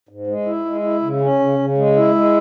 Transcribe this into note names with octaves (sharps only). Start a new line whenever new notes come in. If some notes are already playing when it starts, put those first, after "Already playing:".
G#2
G#3
E4
G#3
E4
C#3
C#4
C#3
C#3
G#3
E4
G#3